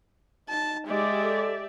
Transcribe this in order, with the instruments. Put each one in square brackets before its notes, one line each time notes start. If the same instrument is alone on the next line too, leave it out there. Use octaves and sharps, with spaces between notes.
[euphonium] D#4 [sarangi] A5
[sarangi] G#3 [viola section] G4 D5 E5
[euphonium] A4